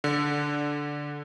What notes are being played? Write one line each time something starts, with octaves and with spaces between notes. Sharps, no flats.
D3